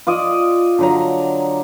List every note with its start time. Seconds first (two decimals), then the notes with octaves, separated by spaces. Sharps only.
0.07 F4 D5 D#5
0.79 D3 F#3 A#5